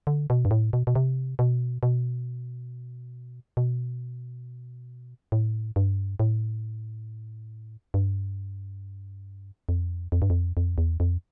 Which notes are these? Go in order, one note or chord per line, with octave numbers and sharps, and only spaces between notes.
D3
B2
G2
A2
B2
B2
C3
B2
B2
B2
A2
G2
A2
G2
F2
F2
G2
F2
F2
E2
F2